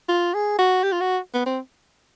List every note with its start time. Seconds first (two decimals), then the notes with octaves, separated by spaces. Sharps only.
0.09 F4
0.34 G#4
0.59 F#4
0.84 G4
0.92 F4
1.01 F#4
1.34 B3
1.46 C4